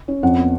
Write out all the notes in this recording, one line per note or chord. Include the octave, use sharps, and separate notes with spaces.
C#4
F2 F#5
B3